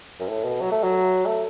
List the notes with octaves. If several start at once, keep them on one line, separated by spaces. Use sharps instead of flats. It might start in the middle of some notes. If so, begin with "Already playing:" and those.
F#2
A2
B2
F#3
A3
F#3
A3